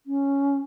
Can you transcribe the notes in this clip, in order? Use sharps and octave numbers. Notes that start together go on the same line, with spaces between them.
C#4